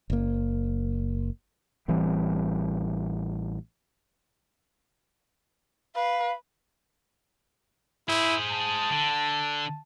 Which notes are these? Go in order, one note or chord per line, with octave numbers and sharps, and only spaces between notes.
F#1 A#3
A1 E3 G3 C4
B4 F5
E4 G#4 C5
A5
D3